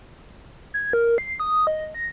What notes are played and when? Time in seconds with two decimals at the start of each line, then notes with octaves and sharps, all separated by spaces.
0.74 G#6
0.93 A#4
1.18 C7
1.40 D#6
1.67 D#5
1.94 A#6